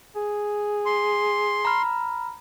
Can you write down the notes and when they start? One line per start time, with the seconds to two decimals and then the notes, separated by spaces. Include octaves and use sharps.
0.16 G#4
0.86 C6
1.65 A#5 B5 F6